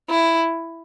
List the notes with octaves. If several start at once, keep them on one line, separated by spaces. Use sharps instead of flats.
E4